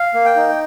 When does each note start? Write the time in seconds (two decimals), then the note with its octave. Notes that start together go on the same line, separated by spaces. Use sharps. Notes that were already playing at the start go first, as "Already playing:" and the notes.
Already playing: F5
0.14 A#3
0.25 G5
0.36 D#4